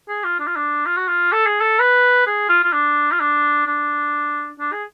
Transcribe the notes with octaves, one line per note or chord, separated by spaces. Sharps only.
G#4
F4
D4
F4
D4
F4
F#4
F4
A4
G#4
A4
B4
G#4
F4
F4
D4
F4
D4
D4
D4
G#4